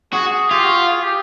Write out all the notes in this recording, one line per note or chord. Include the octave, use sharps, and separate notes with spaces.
F#4 G#4
F4 G4
F#4
G#4
G4